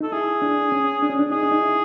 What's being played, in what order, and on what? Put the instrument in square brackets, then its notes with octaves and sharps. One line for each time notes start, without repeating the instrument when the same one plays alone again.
[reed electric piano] D#4 [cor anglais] A4
[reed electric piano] E4 [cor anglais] G#4
[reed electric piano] D4
C#4
D4
C#4
D4
[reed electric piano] D#4 [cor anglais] G#4
[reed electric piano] D4
D#4
E4